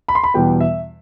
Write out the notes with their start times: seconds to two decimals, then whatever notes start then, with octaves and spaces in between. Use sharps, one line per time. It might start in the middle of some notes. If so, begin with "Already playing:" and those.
0.08 B5
0.15 C6
0.24 B5
0.34 E2 B2 G3 B3 G5
0.61 E5